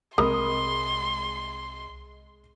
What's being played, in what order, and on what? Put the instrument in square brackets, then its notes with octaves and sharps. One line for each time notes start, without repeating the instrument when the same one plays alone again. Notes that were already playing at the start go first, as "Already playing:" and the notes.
[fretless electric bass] C2 F3 C4 [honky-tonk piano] G#3 B5 D#6 [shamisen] A#4 [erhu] C6